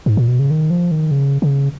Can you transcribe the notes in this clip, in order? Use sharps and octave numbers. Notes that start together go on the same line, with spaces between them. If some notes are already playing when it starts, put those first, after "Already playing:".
G#2
A#2
B2
C#3
D#3
F3
D#3
C#3
C#3